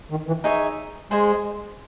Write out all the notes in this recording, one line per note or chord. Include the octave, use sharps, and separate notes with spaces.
D#3
E3
D#4 G#4 C#5 E5
G#3 G#4 C5 D#5 G#5